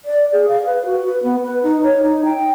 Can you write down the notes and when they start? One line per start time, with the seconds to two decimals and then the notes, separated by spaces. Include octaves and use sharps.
0.05 D5
0.33 G#4
0.48 F5
0.66 B4
0.86 F#4
1.05 B4
1.23 B3
1.44 B4
1.63 D#4
1.83 C#5
2.03 D#4
2.25 G5